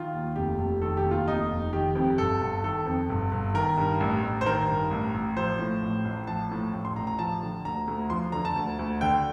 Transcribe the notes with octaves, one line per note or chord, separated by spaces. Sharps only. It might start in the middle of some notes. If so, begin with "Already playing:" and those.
Already playing: D#3 F4
D#2
F1 G4
F1
D#3 A4
G4
D#2
F4
F1 D#4
F1
D#3 G4
F2
G1 A4
G1
D#3 A4
F2
G1
G1
D#3 A#4
G2
A1
A1
C5
D#3 A#4
G2
A1
A1
F3 C5
A2
A1
A1
F3 A5
A2
A1
C6
A1 A#5
A#5
F3 A5
D3
D2 A#5
D2
F3 C6
D3 A#5
A5
D2
D2
D3 G5